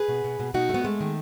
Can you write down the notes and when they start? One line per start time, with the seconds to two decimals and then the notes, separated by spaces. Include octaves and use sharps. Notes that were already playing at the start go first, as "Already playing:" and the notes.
Already playing: G#4 B4
0.08 B2
0.24 B2
0.40 B2
0.54 B2 D#4 F#4
0.69 A3 B3
0.84 G#3 A3
1.00 D#3